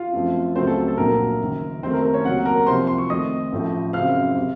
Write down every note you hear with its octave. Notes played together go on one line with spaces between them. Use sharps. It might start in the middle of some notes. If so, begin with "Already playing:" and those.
Already playing: F4 F5
F#2 F3 A3 C4
C#2 C#3 F#3 A3 C4 C5
A4
A4
A#1 A#2 F#3 A#3 A#4
F#1 F#2 D#3
D#2 D#3 A3 C4 C5
A#4
A#4
C#4 C#5
C#2 C3 F#3 A#3 F#4 F#5
A#4 A#5
C2 C3 F3 C5 C6
C6
C#6
F2 D#3 A3 C4 D#5 D#6
A1 A2 F3
F#1 F#2 C#3 F#3 C4 F5 F6
C3